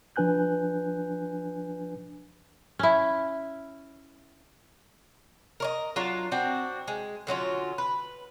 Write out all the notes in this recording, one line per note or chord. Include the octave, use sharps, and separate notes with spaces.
F3 D4 B4 G#5 F#6 G6
C#4 E4
A#4 C#5 D#5
F#3 D4 F4 A#5
C4 D4 F#4
G#3
D3 F#3 C#4 F4
B4